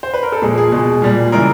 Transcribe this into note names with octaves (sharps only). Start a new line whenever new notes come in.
C5
B4
A#4
A4
A#2 F3 G#3 G#4
G#4
B2 G#3 G#4
A#2 G3
C#3 E3 G#3 A#4